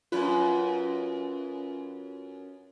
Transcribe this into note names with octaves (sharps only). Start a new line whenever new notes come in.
F#2 F4 B4